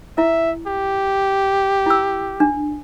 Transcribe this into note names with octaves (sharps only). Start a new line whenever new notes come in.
E4 E5
G4
E4 E6
D4